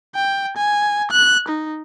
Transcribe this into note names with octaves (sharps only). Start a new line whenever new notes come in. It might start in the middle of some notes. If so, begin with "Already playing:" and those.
G5
G#5
F#6
D#4